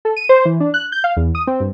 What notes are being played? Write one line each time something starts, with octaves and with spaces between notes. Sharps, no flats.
A4
D#7
C5
E3
D4
F#6
G6
F5
E2
D#6
C4
G2